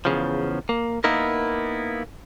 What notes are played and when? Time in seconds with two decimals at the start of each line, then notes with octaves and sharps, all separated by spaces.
0.05 E2 G2 C#3 F3
0.69 A#3
1.04 A#3 B3 D#4 E4 A#4